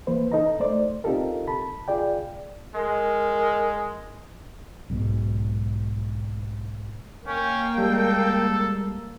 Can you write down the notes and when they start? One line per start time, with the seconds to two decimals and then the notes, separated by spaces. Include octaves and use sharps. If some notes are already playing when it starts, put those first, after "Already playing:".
0.07 E3 A#3 B4 C5
0.32 D#4 A4 D#5 A#5
0.60 A3 C5 D5
1.04 C4 D#4 F4 G4 A4 A#4
1.47 A5 B5
1.88 F4 G#4 D5 G5
2.75 G#3 A#4
4.90 B1 G#2 B2
7.27 A#3 C#4 G5
7.78 G3 G#3 A4